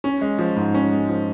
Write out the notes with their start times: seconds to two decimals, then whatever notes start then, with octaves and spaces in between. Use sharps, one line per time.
0.04 C#4
0.21 G#3
0.39 F3
0.56 G#2
0.74 C#4
0.92 G#3
1.09 F3